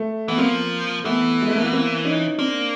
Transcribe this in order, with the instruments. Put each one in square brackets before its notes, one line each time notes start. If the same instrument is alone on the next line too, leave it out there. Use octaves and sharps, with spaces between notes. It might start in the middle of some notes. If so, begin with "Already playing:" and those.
Already playing: [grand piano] A3
[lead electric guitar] E3 [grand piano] B3
[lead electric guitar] F3 [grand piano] A#3 C4
[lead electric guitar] E3 [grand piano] A3 B3
[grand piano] G#3
A3
A#3
B3
A#3 C4
C#4 D#4
[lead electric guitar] A#3 [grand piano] C4 D4